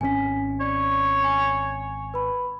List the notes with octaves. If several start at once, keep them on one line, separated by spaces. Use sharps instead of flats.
G#1 B2 C#4 G#5 B6
C#5 D5
G#5
B4 B5